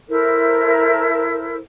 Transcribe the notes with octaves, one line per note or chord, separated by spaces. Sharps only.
E4 A4 A#4 C5